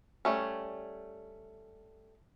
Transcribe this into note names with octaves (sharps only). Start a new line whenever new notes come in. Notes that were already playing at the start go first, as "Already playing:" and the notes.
G3 A3 C#4